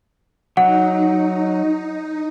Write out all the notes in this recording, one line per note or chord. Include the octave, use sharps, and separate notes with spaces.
F#3 D#4 F#5